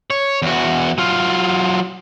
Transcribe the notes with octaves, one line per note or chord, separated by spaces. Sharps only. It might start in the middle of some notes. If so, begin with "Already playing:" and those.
C#5
E2 F#4
F#3 F4